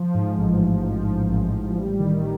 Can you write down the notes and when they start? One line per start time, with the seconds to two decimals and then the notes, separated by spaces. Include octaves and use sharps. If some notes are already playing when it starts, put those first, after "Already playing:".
Already playing: F3
0.14 G#2
0.38 A1
0.61 A1
0.84 F3
1.07 G#2
1.30 A1
1.53 A1
1.77 G3
2.00 D#3